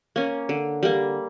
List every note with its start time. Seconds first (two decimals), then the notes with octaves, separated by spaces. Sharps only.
0.16 A#3 C#4
0.49 D3
0.83 G3 A#3